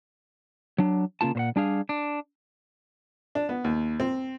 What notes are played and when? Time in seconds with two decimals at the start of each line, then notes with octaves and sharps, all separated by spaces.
0.78 F#3 D4
1.21 C#3 A#3 F4 A5
1.35 A#2 C5 F#5
1.56 G3 D4 G#4 F5
1.89 D4
3.35 D4
3.49 B3
3.64 D#2
4.00 C4